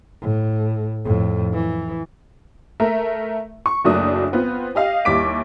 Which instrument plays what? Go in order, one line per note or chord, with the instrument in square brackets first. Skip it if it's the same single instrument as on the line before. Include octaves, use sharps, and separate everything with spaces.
[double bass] A2
F2 A2
E3
[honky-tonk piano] A3 A#4 E5
C#6
F#1 F#3 A3 A#3 D4 D#6
B3 C4 F4
G4 D#5 F5
D#2 G3 E4 D6 B6 D7